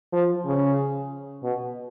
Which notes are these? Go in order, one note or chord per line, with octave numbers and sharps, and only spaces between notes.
F3
C#3
B2